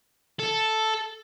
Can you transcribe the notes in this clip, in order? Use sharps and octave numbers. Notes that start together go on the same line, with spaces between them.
A4